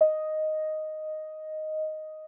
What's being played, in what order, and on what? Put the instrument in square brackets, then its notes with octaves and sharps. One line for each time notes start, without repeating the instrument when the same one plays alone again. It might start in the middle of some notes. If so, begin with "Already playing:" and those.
[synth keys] D#5